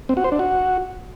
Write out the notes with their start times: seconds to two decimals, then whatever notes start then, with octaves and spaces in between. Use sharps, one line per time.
0.09 C4
0.17 F#4
0.24 C5
0.32 D4
0.39 F#4